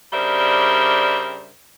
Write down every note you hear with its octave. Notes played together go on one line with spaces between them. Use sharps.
C#3 G3 D4 A#4 C5 E5